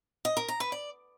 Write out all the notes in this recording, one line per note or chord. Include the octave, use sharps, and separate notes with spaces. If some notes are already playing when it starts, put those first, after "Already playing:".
D#5
A#4
A#5
B4
D5